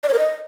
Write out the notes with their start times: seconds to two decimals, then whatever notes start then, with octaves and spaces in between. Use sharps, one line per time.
0.03 D5
0.09 C#5
0.14 A#4
0.19 D#5